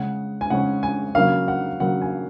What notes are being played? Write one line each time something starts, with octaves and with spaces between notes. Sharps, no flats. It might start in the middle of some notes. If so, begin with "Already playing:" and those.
Already playing: C#3 G#3 C#4 F#5
G#5
C#3 G#3 C#4 F#5
G#5
C#3 F#3 A#3 C#4 F5
F#5
C#3 F#3 A#3 C#4 F#5
G#5